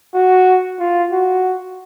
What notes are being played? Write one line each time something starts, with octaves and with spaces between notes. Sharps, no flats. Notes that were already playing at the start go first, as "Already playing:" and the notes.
F#4
F4
F#4